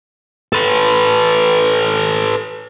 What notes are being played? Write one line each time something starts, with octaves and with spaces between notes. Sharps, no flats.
A4 B4